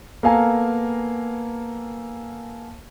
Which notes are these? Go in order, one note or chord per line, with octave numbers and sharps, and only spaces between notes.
A#3 B3 A4 F5 G#5 A#5